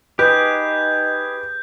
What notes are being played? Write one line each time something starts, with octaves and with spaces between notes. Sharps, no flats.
D#4 G4 G#4 B4 G6